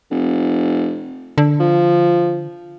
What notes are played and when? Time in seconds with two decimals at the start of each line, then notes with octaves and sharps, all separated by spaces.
0.11 F1
1.38 D3
1.60 F3